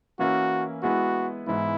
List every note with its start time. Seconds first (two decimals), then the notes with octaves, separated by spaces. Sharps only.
0.19 E3 A#3 C#4 E4 F#4 A#4
0.83 G#3 B3 E4 F#4 B4
1.47 G#2 E3 B3 E4